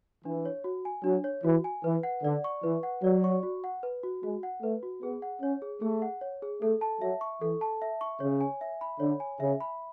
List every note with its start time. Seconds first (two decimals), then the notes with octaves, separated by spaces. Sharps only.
0.25 E3 D4
0.45 C#5
0.64 F#4
0.85 G#5
1.04 F#3 D4
1.24 C#5
1.44 E3 F#4
1.64 G#5
1.84 E3 B4
2.03 F#5
2.23 D3 D5
2.44 C#6
2.63 E3 B4
2.83 F#5
3.03 F#3 D5
3.24 C#6
3.43 F#4
3.64 F#5
3.83 B4
4.03 F#4
4.23 G#3 F#4
4.43 F#5
4.62 A3 B4
4.83 F#4
5.02 B3 G#4
5.22 F#5
5.42 C#4 C#5
5.62 G#4
5.82 A3 G#4
6.02 F#5
6.21 C#5
6.42 G#4
6.62 A3 A4
6.81 A5
7.01 F#3 E5
7.21 C#6
7.41 E3 A4
7.61 A5
7.82 E5
8.01 C#6
8.20 C#3 C#5
8.41 G#5
8.61 E5
8.81 B5
9.00 D3 C#5
9.20 G#5
9.40 C#3 E5
9.61 B5